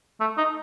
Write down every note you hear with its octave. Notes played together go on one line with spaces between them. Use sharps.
A3
D#4